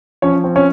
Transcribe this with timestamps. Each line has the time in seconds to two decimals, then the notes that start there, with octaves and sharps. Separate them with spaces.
0.22 F3 C#4 C#5
0.44 C4
0.56 C#4 C#5